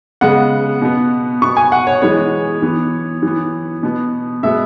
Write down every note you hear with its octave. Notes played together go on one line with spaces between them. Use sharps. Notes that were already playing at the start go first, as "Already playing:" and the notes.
C#3 G#3 B3 F#5
B2 B3
B2 B3 C#6
G#5
F#5
C#5
E3 G#3 B3 C#5
E3 B3
E3 B3
B2 B3
B2 G#3 B3 E5